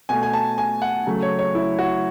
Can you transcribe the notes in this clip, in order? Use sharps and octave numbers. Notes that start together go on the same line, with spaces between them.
B2 A3 G#5
G#5
A5
G#5
F#5
C#3 F#3 A3
C#5
C#5
E4
F#4